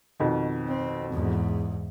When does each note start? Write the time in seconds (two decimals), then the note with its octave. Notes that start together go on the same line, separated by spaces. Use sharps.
0.20 F2 B2 D#3
0.69 C4
1.13 E2 G#2